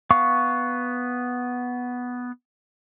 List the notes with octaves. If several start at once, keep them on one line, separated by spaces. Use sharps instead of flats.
B3 F5 C#6